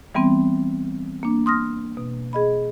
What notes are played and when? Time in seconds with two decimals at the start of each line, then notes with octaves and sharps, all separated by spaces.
0.15 E3 G3 B3 C4
1.23 A#3 D4
1.46 C6 D#6 F6 A#6
1.97 B2
2.33 G#4 D#5 B5